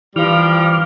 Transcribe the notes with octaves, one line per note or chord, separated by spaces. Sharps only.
G2 E3 F3 G3 D6 F6